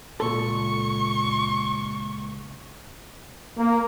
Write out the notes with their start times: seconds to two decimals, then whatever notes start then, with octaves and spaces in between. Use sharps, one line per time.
0.20 C#2 A#2 A4 C#6
3.57 A#3